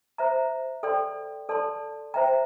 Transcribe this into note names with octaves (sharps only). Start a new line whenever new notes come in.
C5 E5 A#5
A4 D5 G5 C6
A4 D5 A5 C6
C5 E5 G5 A#5